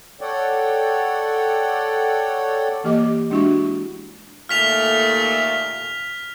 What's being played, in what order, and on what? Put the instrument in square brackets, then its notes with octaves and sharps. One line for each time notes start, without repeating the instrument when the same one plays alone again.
[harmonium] A4 C#5 D5 F#5 G5
[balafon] E3 A#3 G4 D#5 D6
G#3 D4 E4 F#4 E5 C#6
[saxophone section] D#2 A#2 A3 [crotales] F6 B6 F7